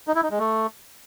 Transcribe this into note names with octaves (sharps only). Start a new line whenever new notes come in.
D#4
E4
D#4
G#3
A3